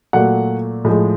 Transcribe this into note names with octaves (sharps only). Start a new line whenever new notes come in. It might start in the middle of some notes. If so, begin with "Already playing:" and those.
A#2 F#3 A3 F#5
A2 F3 G#3